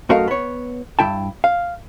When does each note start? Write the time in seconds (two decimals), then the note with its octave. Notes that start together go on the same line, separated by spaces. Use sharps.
0.09 F#2 A3 F#4 A#4 D#5 F5
0.28 B3 C#5
0.99 G2 E4 G5 A5
1.44 F5